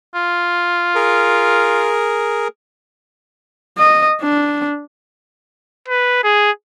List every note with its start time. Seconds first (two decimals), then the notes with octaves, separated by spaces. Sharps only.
0.14 F4
0.95 G#4 A#4
3.78 D#5
4.22 D4
5.88 B4
6.24 G#4